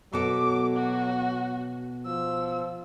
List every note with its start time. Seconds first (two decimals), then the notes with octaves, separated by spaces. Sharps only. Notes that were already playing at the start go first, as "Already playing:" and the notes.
0.13 B2 F#3 A4 D6
0.76 F#4
2.06 F3 E6